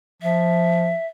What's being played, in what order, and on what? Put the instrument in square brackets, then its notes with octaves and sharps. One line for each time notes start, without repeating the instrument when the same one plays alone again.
[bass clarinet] F3 [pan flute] E5